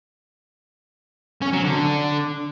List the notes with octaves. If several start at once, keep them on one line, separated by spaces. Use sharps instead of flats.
C#4
F#3
D3